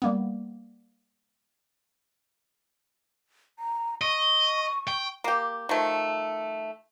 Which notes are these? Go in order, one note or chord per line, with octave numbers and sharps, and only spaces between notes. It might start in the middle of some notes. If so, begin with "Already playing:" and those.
G3 A#3 B3
A#5
D#5 C#6
G5
A#3 G4
D#3 F3 A3